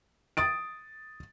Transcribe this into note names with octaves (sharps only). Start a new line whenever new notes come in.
D#6 A6 D7